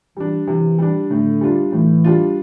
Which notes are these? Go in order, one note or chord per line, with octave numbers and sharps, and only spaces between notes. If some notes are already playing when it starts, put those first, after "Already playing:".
E3 G3 D4
C3 E3
G3 D4
A2 D3
G3 D4 F4
A2 E3
G3 D4 F4